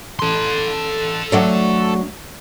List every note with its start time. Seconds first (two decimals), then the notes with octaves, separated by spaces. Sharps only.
0.19 A4 C6
1.32 F#3 A3 D4